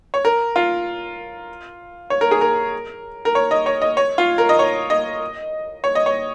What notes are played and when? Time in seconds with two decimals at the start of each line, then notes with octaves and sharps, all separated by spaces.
0.14 C#5
0.25 A#4
0.56 F4
2.10 C#5
2.21 A#4
2.31 G#4
2.41 A#4
3.25 A#4
3.35 C#5
3.51 D#5
3.66 C#5
3.82 D#5
3.97 C#5
4.18 F4
4.38 A#4
4.49 D#5
4.59 C#5
4.90 D#5
5.84 C#5
5.95 D#5
6.06 C#5